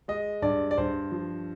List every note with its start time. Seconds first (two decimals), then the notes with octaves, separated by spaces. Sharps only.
0.08 G#3 D#5
0.42 G2 D5
0.71 D5
0.78 G2 C5
1.11 F3